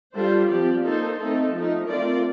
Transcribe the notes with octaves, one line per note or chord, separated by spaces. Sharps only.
G3 D4 F4 A4 C5
F3 C4 G4 D5
A#3 D#4 A4 C5
A3 C4 D#4 A4
F3 A3 D#4
A3 C4 F4 A#4 D5